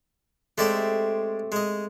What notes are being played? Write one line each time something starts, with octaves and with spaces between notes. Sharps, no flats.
G#3 A3 C4 G4 D5 A5
G#3 D#5